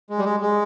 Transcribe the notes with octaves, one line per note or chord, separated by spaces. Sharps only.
G#3
G3
G#3
G#3